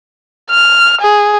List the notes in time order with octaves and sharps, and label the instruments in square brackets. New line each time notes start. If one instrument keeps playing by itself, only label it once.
[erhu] F6
G#4